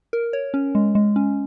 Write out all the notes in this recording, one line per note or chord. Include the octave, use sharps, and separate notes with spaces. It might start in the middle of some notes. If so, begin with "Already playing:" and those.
A#4
C#5
C#4
G#3
G#3
C#4